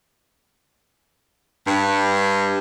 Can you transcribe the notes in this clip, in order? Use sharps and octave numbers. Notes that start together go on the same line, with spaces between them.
G2